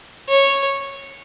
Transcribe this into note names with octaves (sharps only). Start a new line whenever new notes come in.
C#5